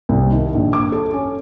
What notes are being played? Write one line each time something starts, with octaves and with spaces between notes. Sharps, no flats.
C2
D#3
A#1
D6
A4
C#4